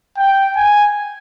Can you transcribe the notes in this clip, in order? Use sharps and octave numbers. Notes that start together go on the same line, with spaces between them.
G5
G#5